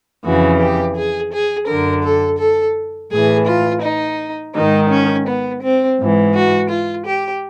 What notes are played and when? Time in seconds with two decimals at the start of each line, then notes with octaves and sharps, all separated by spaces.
0.25 F2 C#3 E3 F#4
0.61 G4
0.96 G#4
1.33 G#4
1.68 F#2 D3 A#4
2.05 A4
2.40 A4
3.12 A2 E3 G#4
3.48 F4
3.83 D#4
4.55 G#2 D#3 D#4
4.91 C#4
5.27 B3
5.63 C4
5.99 G#2 E3
6.35 F#4
6.70 F4
7.06 G4